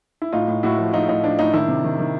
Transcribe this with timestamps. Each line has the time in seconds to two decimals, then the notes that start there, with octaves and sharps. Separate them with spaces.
0.22 E4
0.33 A2 D#4 F4
0.48 A2
0.63 A2 E4 F#4
0.79 F3
0.93 F3 D#4 F4
1.09 A2 D#4
1.24 F3 D4
1.39 A2 D#4
1.53 D#3 D4 E4
1.68 C3
1.84 D#3
1.99 D#3